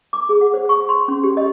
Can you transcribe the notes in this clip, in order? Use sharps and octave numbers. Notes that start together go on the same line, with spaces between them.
D6
G#4
F#5
C5
C#6
C6
C#4
G4
D#5